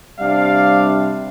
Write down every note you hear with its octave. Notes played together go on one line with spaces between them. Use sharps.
C3 G3 D4 D5 F5